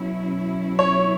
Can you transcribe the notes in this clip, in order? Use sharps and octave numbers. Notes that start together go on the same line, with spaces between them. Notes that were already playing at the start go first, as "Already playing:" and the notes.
Already playing: B2 F#3 C#4 E4
C#5